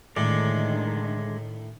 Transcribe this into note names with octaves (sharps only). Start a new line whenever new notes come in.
A2 D3 D#3 G#3 D5